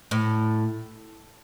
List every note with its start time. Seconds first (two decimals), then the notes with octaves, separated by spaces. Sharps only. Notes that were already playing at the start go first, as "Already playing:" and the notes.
0.11 A2